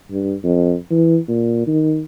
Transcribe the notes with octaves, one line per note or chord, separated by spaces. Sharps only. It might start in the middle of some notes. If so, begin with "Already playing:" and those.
G2
F2
E3
A#2
D#3